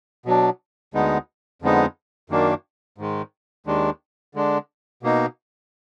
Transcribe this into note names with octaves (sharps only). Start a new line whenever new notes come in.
B2 F#3 D4
D2 D3 G#3 B3 D#4
F2 D3 G#3 B3 D#4
F#2 D#3 A#3 D4
G#2 D#3 G#3
D#2 D#3 G#3 D4
D3 G#3 D4
B2 A#3 D#4